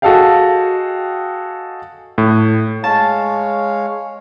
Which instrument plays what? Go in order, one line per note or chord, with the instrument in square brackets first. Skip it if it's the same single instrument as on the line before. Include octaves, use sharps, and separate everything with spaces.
[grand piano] F#4 G#4 A4 D#5 F5 G5
[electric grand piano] A2
[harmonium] G#3 C#5 F5 [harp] A5